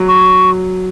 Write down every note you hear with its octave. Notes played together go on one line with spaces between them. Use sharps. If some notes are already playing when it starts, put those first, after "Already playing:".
Already playing: F#3
C#6